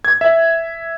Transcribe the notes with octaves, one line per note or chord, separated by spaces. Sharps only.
G#6
E5